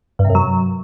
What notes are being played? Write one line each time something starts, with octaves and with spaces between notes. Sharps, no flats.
G2
C3
F#2
F#3